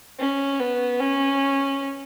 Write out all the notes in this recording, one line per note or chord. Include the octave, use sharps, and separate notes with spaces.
C#4
B3
C#4